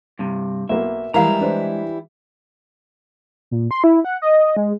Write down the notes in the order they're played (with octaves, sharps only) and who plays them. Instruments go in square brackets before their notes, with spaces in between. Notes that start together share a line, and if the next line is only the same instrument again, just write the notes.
[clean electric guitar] G2 C3
[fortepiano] B1 A#3 [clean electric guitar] E5
[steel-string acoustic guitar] E3 G3 E4 [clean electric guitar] G#3 A#5 [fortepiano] A#4 F5
[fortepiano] D4 B4 C5
[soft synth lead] A#2
C6
E4
F#5
D#5
G#3